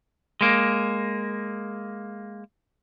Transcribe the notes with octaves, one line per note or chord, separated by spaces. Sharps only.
G#3 A#3